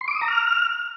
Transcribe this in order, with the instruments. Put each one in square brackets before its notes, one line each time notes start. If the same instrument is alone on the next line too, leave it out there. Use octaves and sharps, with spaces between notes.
[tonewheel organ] C6
D6
D#6
A#5
F6